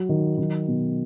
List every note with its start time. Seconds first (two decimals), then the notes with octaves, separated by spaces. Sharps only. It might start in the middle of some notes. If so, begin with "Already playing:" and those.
Already playing: F#3
0.09 D#3
0.39 F#3
0.68 B2